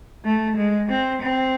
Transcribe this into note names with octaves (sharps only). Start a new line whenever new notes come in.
A3
G#3
C4
C4